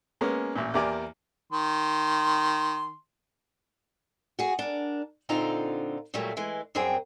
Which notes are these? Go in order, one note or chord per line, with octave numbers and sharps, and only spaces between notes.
G#3 A#3 B3 C#4
A1 A#2
E2 A#3 G4 D5 G#5
D#3 C6
F#4 G#4
D4 A#4
A#2 D3 C4 D#4 F4 A#5
A#2 F#3 G3 A3 A#3
E3 G#3
F#2 G3 C4 G#4 A#4 G5